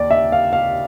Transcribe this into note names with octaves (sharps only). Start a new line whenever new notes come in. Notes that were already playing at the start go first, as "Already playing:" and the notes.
Already playing: D#2 D5
E5
F5
F5